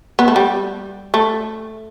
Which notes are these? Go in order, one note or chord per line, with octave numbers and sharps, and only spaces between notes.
B3
A3
G3
A3